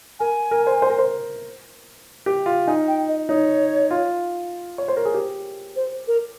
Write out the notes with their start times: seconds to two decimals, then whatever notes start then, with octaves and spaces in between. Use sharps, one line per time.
0.19 A#4 G#5
0.51 A#4
0.67 C5
0.82 C5
0.90 A#4
0.99 C5
2.26 G4
2.46 F4
2.67 D#4 G#5
2.88 G5
3.08 D#5
3.29 D#4 C#5
3.91 F4
4.78 C#5
4.88 C5
4.97 A#4
5.05 G#4
5.14 G4
5.76 C5
6.07 A#4